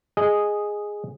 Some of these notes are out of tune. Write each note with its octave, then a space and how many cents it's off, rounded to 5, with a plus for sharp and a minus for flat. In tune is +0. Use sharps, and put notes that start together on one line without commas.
G#4 +0 D#5 -5